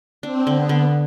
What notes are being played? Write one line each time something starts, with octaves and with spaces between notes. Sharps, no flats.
C4 D4
D3
B3
D3